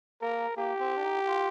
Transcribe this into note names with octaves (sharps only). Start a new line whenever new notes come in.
A#3 A#4
A#3 G4
C4
D4
D#4
F4